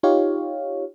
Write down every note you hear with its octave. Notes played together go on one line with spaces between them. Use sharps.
D#4 F4 G4 C#5 F5